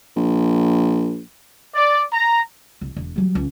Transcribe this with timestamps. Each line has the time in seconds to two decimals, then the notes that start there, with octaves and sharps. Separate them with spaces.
0.16 A#1
1.75 D5
2.12 A#5
2.81 C2
2.96 E1
3.16 F#3 G3
3.35 C#2